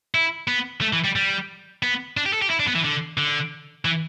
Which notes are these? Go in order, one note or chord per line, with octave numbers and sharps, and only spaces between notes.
E4
B3
A3
E3
G3
G3
B3
D4
G4
A4
G4
E4
D4
B3
E3
D3
D3
E3